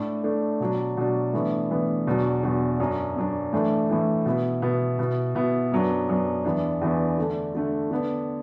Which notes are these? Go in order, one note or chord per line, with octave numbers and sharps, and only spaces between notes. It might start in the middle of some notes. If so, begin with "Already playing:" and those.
Already playing: A2 A3 D4
A2 A3 D4
B2 F#3 D4
B2 F#3 D4
A2 E3 B3 D4
A2 E3 B3 D4
E2 B2 F#3 D4
E2 B2 F#3 D4
F#2 F#3 D4
F#2 F#3 D4
A2 E3 A3 D4
A2 E3 A3 D4
B2 B3 E4
B2 B3 E4
B2 B3 E4
B2 B3 E4
F#2 F#3 B3 D4
F#2 F#3 B3 D4
E2 E3 B3 D4
E2 E3 B3 D4
D3 A3 D4
D3 A3 D4
D3 B3 D4